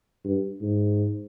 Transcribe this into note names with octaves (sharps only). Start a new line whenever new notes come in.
G2
G#2